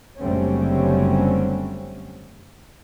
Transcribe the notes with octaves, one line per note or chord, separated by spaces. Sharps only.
F#1 D3 G3 A3 C4 C#4